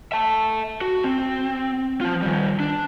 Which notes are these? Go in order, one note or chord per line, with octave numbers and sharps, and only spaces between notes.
E5 A5
F#4
C4
F3 F4
D#3 G3
D4